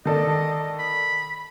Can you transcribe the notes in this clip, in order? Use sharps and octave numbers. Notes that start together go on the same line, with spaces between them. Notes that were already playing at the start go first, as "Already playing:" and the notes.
D#3 A4 D5 D#5
B5